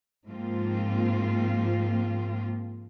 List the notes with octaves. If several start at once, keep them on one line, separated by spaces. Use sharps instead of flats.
G#2 F3 A#3 C4 F4